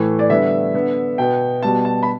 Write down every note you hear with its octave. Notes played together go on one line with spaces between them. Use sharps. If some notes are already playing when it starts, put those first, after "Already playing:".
Already playing: A2 E3 A3
D5
D3 G3 B3 E5
D3 B3
B2 B3 G5
B2 G3 B3 A5
A5
B5